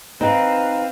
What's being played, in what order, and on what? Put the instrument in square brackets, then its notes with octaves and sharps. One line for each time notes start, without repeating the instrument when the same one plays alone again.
[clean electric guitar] C4 [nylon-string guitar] D#4 [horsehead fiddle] B4 F5